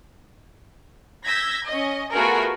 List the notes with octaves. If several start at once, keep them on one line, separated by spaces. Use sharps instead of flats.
E6 G6 G#6 A#6 B6
C#4 D#5
A3 B3 F4 F#4 G#4 A#4